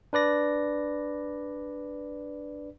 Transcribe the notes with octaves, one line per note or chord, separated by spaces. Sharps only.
D4 B4 D5 A#6